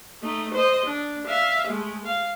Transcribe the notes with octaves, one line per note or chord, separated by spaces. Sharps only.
A3 D#4
C5 D#5
D4
E5 F5
G#3 A3
F5